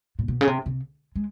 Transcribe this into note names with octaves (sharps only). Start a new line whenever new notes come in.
A#2
B2
C#3
C3
C3
G#3